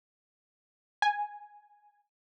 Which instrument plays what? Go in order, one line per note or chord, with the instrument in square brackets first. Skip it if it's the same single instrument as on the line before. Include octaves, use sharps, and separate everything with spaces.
[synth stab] G#5